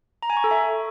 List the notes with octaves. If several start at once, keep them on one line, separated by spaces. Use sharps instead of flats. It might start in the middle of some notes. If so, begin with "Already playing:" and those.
A#5
G#5
C#6
A4
E5